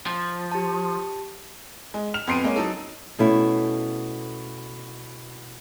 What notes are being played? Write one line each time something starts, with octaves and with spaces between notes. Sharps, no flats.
F3
G4 A5
G#3
F6 E7 F7
F2 B3 C6 C7 D7 D#7
G#3 A#3 C#4
F#3 D#4 A4
B2 A3 C#4 E4